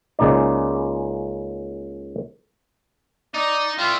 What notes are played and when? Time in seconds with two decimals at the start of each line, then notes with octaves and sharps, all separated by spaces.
0.19 C#2 C#3 A#3 D#4 D5
3.34 D#4 D5
3.78 G3 E4 F4